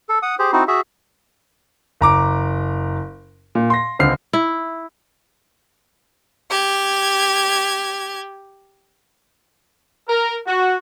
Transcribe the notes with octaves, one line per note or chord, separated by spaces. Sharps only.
A4
F#5 D#6
G4 G#4 C5
C4 D#4 E4 F#4
F#4 G#4 E5
F#1 A#5 D6 D7
A#2
C6 A#6
C#2 D3 C4 F6 C7
E4
G4 G#6
A#4
F#4